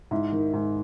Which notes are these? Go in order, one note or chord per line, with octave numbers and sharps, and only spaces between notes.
G#2 E4
D#3
G#2